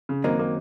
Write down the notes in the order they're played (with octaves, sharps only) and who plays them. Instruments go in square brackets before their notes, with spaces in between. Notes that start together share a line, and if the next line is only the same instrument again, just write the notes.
[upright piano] C#3
[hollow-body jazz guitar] F#2 D#3 F#3 C4 D#4 [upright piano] A#3
[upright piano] A#3